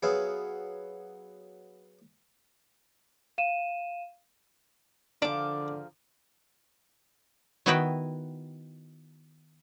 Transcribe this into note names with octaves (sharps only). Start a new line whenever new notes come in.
F#3 B3 G#4 E5 F5
F5 D#7 E7
D3 F3 D4 G#4 A#4 D6
D#3 B3 E4 F#4 B4 G5